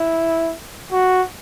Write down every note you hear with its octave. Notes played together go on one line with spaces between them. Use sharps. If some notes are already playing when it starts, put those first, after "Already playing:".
Already playing: E4
F#4